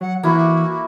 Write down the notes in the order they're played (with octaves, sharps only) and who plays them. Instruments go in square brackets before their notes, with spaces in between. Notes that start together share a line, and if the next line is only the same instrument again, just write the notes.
[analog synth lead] F#3 [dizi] F#5
[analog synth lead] E3 [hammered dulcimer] A#3 E4 [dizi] F#4